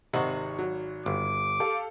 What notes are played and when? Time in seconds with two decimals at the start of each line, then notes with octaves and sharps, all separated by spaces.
0.13 G#1 C3 D#5 F#5 C#6 F#7
0.59 F#3
1.06 G1 D6
1.60 G4 A4 F5